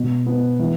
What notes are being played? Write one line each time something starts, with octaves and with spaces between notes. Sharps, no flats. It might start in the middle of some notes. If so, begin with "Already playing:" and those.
Already playing: B2
B3
E3